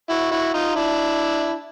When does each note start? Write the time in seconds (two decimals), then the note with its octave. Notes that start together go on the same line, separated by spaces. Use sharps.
0.10 E4 F#4
0.32 E4 F#4
0.54 D#4 F4
0.76 D4 E4